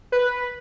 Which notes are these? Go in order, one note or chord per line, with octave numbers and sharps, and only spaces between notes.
B4